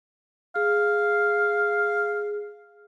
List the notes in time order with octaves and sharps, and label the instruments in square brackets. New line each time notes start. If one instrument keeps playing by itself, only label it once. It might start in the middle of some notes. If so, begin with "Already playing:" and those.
[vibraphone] G#4 [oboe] F5